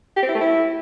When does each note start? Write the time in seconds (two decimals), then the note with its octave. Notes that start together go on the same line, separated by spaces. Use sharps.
0.17 G4
0.23 C4
0.29 E4
0.35 A3
0.41 E4